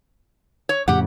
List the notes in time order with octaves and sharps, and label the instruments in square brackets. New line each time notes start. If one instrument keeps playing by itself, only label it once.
[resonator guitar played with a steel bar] C#5
[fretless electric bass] F2 A2 C#3 [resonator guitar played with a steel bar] G4 F#5